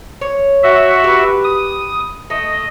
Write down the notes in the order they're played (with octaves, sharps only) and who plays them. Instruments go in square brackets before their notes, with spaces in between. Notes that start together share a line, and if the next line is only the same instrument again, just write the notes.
[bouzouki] C#5
[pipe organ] F#4 E5
[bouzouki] G4 B4
[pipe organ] D#6
[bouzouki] A3 [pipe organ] D#5